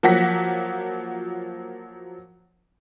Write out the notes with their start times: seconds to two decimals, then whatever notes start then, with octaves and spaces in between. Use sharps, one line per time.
0.03 F3 F#3 A#3 F#5 A#6 B6